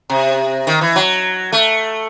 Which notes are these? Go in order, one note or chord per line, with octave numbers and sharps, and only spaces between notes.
C3
D#3
E3
F#3
A3